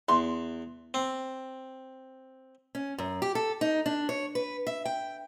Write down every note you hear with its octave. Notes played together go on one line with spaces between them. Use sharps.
E2 C6
C4
C#4
F#2
G4
A4
D#4
D4
C#5
B4
E5
G5